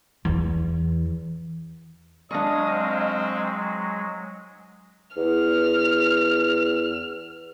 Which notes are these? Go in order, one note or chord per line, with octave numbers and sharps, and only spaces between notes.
E2 E3
F#3 G#3 D4 D#5 F5 C#6 D#6
C4
E2 F6